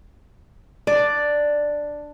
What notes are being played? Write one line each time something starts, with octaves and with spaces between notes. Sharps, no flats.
D4 D5